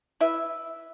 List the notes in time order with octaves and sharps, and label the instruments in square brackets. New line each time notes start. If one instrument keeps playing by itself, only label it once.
[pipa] E4 B4 E5